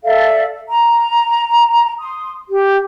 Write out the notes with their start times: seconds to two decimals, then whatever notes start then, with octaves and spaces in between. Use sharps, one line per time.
0.03 A4 D5 E5 F5
0.68 A#5
1.99 C6 D#6
2.48 G4